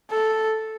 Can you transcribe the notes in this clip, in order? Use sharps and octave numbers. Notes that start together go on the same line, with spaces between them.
A4